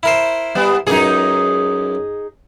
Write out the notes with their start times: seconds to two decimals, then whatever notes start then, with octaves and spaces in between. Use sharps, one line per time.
0.03 E4 A#4 C5
0.55 G3 B3
0.87 C#2 F#2 D#4 G#4